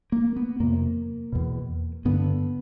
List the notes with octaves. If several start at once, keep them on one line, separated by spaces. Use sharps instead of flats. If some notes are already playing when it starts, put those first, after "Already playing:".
A#3
B3
F2 C3 A#3
E2 B2
G2 D3 B3